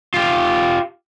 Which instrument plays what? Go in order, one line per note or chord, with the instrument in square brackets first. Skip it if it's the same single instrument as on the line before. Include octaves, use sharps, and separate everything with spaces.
[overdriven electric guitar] F4 G4